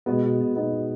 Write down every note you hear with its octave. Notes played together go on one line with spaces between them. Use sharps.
B2 G#3 B3
B2
B2
B2 B3 D#4
B2